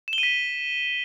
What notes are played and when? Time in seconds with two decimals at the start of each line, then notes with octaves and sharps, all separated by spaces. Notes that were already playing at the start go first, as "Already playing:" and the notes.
0.08 E7
0.13 G7
0.18 D#7
0.23 B6